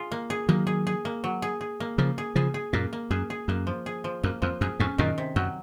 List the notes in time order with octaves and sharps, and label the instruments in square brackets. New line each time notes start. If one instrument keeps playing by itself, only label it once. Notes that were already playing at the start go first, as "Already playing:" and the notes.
Already playing: [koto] F4 G#4
A#3
G#4
[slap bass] D#3 F#3 [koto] A#3
[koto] G#4
G#4
A#3
F#3
G#4
G#4
A#3
[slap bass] C#3 F3 [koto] A#3
[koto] G#4
[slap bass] C#3 F3 [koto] G#4
[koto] G#4
[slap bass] F#2 A#2 [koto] A#3
[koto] A#3
[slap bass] F#2 [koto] G#4
[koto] G#4
[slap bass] F#2 [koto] A#3
[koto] F3
G#4
F3
[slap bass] F#2 [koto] A#3
[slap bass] F2 [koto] F3
[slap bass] F#2 [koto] G#4
[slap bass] F2 G#2 [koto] C#4
[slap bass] F#2 A#2 [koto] D#3
[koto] C3
[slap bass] F#2 [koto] F#3